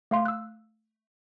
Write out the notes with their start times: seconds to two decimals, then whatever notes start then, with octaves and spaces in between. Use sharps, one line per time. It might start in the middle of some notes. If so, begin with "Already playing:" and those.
0.11 A3 F5 C6
0.25 E6 F#6